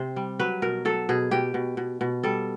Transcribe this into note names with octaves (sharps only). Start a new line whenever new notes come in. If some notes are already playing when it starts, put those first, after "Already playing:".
Already playing: C3 C5
G3
F#3 B4
B2 A#4
F#3 A4
B2 G#4
B2 G4
B2
B2
B2
G3 A4